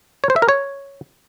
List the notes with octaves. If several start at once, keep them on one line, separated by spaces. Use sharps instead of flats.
C#5
C5
E5
A#4
C#5